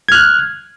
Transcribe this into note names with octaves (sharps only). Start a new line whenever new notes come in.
F6 F#6 G#6